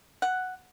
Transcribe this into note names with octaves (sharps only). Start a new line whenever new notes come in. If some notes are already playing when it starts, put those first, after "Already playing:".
F#5